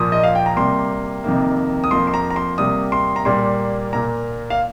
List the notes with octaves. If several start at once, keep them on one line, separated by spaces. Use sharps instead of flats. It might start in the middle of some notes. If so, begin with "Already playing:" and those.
Already playing: A#2 F3 A#3 D#6
D#5
F5
G5
A#5
C3 G3 A#3 C6
F2 C3 D#3 A#3
D#6
F2 F3 A#3 C6
C6
A#5
A#5
C6
C3 G3 A#3 D#6
C6
A#5
A#2 G3 A#3 C6
A#2 A#3 A#5
F5